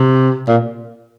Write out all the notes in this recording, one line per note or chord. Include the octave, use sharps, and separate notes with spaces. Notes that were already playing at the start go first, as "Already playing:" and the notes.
Already playing: C3
A#2